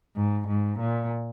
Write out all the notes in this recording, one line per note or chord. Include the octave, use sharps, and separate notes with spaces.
G#2
G#2
A#2